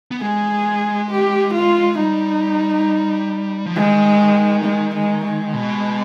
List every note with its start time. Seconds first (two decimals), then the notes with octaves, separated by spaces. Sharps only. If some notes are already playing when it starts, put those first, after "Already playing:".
0.11 B3
0.21 G#3 G#4
1.10 G4
1.54 F4
1.98 G3 D#4
3.66 F3
3.76 D#3 G#3
4.64 G#3
4.95 G#3
5.25 G#3
5.54 B2